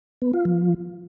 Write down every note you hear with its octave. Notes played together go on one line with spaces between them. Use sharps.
B3
F4
F3